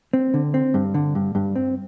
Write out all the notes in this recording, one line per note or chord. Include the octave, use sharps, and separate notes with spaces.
C4
D3
C4
G2
D3
G2
G2
C4